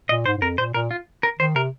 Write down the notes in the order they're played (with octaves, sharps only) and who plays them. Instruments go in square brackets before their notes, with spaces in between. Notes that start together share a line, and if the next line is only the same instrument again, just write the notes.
[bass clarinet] A#2 [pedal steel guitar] D#5
[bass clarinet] G#2 [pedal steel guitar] C5
[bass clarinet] G#2
[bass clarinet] F2 [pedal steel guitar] A#4
[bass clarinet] A#2 [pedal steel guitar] C5
[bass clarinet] A#2 [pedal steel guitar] A#4
[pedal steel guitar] F4
A#4
[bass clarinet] D#3 [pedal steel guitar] C5
[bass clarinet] C3 [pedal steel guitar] A#4